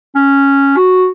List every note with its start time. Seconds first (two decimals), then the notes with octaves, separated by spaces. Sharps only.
0.16 C#4
0.77 F#4